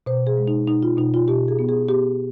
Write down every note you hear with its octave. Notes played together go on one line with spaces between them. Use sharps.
B2 C5
G#4
G#3
D#4
B2 D#4
F4
B2 D#4
F4
B2 G4
G#4
B3
G#4
B3 G4